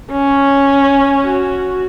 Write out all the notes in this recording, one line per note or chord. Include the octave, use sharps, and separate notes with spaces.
C#4
F#4